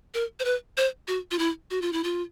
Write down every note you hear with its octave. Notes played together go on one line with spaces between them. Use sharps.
A#4
C5
B4
C5
F#4
F4
E4
F#4
F4
E4
F4